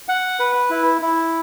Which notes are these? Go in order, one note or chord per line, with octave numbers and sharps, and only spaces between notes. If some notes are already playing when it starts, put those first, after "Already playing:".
F#5
B4
E4
E4